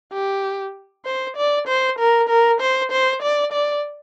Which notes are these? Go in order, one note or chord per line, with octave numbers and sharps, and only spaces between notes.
G4
C5
D5
C5
A#4
A#4
C5
C5
D5
D5